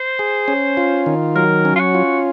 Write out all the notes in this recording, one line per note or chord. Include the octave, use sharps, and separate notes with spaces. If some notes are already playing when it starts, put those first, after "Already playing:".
Already playing: C5
G#4
C#4
F4
D#3
F#3 A#4
C#4
F4
F#4
F4